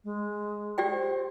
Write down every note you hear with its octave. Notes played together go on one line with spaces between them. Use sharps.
G#3
G4 D5 G5
C5